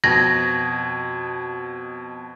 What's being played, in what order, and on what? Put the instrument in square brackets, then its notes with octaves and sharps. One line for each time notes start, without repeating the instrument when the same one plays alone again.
[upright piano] F2 B2 [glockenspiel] G#6 [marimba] A#6